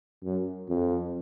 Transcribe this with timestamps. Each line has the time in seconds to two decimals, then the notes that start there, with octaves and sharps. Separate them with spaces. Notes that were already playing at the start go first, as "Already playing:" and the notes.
0.23 F#2
0.69 F2